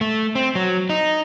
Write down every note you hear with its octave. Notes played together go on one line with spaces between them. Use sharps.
A3
C4
F#3
D#4